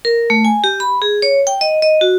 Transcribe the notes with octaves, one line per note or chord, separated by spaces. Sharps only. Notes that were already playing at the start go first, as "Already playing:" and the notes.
A#4
A3
G#5
G4
B5
G#4
C#5
G5
D#5
D#5
F#4